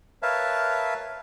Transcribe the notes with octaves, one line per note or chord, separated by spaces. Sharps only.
A#4 B4 C#5 E5 F5 A5